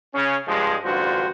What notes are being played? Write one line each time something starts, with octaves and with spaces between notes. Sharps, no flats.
C#3 C#4
G2 F3 G#3
A1 G2 D3 F4 F#4 C5